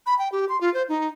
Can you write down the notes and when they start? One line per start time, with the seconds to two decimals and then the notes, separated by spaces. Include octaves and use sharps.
0.06 B5
0.19 G5
0.32 G4
0.49 C6
0.61 F4
0.74 C5
0.89 D#4